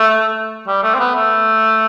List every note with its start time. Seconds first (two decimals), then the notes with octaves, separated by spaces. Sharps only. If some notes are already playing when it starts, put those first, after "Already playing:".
Already playing: A3
0.68 G3
0.83 A3
0.95 C4
0.99 B3
1.15 A3